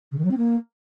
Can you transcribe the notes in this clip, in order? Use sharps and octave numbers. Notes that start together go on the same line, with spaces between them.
C#3
D#3
F#3
C4
A#3